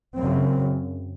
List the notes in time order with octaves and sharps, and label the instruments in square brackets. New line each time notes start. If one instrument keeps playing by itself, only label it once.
[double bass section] F#2 C#3 C4